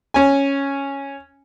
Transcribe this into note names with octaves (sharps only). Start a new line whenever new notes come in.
C#4 G#5